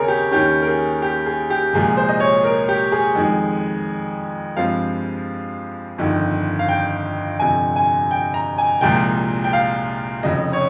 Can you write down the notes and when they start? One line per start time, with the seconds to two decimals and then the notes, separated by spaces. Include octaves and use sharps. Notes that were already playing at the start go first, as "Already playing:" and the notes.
Already playing: D#2 C#3 C4 G#4 A#4 C#5
0.08 G4
0.31 D#2 D#3 A#3 C#4 G4
0.62 A#4
0.67 G#4
1.02 G4
1.26 G#4
1.50 G4
1.73 C2 A#2 F3 G#3 G#4
1.97 C5
2.09 D#5
2.20 C#5
2.44 A#4
2.69 G4
2.92 G#4
3.15 F2 D#3 G#3
4.57 G2 F3 G#3 C4 F5
5.98 G1 F2 D#3
6.59 F5
6.69 G5
7.39 G1 F2 C3 G#5
7.76 G#5
8.11 G5
8.34 A#5
8.58 G#5
8.81 C2 A#2 F3 G#3 G5
9.44 G5
9.53 F5
10.23 F1 F2 C#3 D#5
10.53 C#5